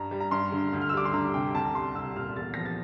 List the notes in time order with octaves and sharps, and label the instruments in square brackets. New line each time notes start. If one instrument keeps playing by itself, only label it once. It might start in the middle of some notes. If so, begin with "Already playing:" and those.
Already playing: [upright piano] G2 A#5
G3
A#5
G2 C6
D3
D2
F6
E6
G3 D6
C6
D2 A#5
C3 G5
C2 A5
A#5
G3 C6
C2 E6
A#2 F6
E2 A6
F3 A#6
A6